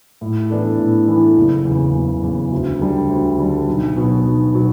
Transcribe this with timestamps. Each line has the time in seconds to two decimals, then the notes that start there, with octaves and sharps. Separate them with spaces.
0.21 A2
0.50 E3 B3 D4 A4
0.79 A2
1.07 E3 B3 D4 A4
1.37 F#1
1.65 E2 C#3
1.94 F#1
2.23 E2 C#3
2.52 D2
2.81 D3 G3
3.09 D2
3.39 D3 G3
3.67 B1
3.96 B2 F#3 B3
4.25 B1
4.54 B2 F#3 B3